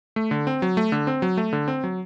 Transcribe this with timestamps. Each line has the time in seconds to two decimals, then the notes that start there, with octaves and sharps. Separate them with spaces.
0.16 A3
0.31 D3
0.47 C4
0.62 F#3
0.77 A3
0.92 D3
1.07 C4
1.22 F#3
1.37 A3
1.53 D3
1.68 C4
1.84 F#3